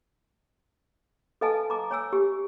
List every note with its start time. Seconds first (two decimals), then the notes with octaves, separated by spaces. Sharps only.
1.41 A4 B4 D#5 F5 G#5 A5
1.70 A#5 D6
1.91 C#5 G#5 E6
2.13 G4